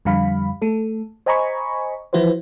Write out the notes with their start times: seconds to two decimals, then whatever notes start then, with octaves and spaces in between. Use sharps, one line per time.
0.05 F2 D3 G3 F5 B5
0.62 A3 A4
1.26 C5 D#5 G#5 A#5 B5 C#6
2.13 E3 F3 E4 F#4 B4 C5